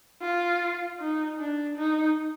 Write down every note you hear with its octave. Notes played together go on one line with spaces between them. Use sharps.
F4
D#4
D4
D#4